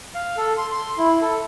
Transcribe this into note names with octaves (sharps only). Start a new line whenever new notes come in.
F5
A4
C6
C6
E4
A4